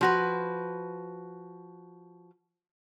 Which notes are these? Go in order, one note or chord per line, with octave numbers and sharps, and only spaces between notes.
F3 F#4 B4